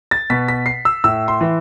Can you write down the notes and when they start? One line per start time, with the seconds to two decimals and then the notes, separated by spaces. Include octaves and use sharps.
0.11 A6
0.30 B2 B6
0.48 B6
0.66 C7
0.85 E6
1.04 A2 E6
1.28 C6
1.41 E3